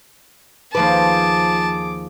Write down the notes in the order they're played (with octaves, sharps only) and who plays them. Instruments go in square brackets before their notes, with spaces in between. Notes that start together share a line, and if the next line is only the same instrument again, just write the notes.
[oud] D#2 F3 B4 [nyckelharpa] G#4 D6 [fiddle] A5